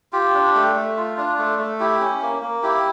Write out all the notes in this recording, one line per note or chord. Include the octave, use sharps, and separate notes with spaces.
F4 G4
D4
A3
A3
F4
D4
A3
A3
E4 G4
C#4
A#3
A#3
E4 G4